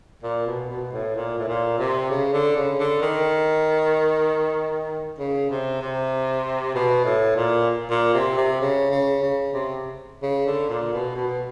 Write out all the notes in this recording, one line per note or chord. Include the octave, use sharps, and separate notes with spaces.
A#2
B2
B2
A2
A#2
A2
A#2
C3
C#3
D3
C#3
D3
D#3
C#3
C3
C3
B2
A2
A#2
A#2
C3
C3
C#3
C#3
C#3
C3
C#3
D3
A#2
B2
B2